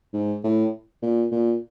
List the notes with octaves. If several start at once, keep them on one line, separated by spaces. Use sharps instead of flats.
G#2
A2
A#2
A#2